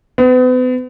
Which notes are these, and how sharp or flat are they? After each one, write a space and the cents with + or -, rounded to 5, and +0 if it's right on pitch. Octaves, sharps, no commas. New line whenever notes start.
B3 +40